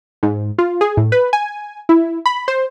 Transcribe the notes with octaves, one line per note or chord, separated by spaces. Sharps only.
G#2
F4
G#4
A2
B4
G#5
E4
B5
C5